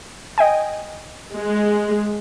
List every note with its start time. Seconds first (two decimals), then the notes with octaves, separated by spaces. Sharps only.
0.38 D#5 G5 G#5
1.34 G#3